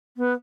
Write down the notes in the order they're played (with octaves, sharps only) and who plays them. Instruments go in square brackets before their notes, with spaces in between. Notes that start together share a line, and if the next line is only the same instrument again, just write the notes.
[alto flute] B3